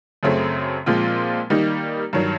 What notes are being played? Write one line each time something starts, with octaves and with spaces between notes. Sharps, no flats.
F#2 C#3 F#3 A3 C4
A#2 F3 G#3 C4 F4
D#3 G3 A#3 D#4
G2 D#3 F#3